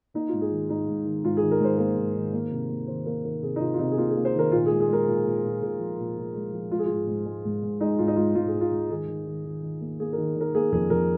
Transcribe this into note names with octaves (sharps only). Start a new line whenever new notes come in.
A#3 D#4
G#2 F4
G#4
D#3
G#2 D#4
G#2
D#3
G#2 F4
D#3 G#4
A#4
G#2 C5
A#3 A#4
G#2
D#3
A#3
C3
A#3
D#3 C5
A#3 A#4
D#3 A#4
C3 G#4
D#4
C3 F4
F4
C3 D#4
G#4
A#3 F4
G#4
A#3
C5
D#3 A#4
A#2 F4
G#3 G#4
G#4
G#3 A#4
A#2
A#2
A#2
A#2 G#4
F3
A#2
A#2
G#3
F3
G#3 F4
G#4
G#2 F4
G#2
G#3
G#2
G#2
G#3 D#4
G#2 F4
D#4
G#3 F4
G#2 F4
G#4
G#2
F4
G#2
D#3 G#4
D#3
D#3
D#3
D#3
A#3
A#3 G#4
D#3 A#4
D#3 A#4
A#3 G#4
F2 G#4
F2 A#4